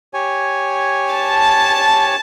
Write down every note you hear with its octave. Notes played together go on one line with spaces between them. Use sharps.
G4 C#5 G#5
A5